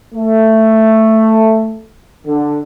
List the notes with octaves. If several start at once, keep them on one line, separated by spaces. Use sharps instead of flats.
A3
D3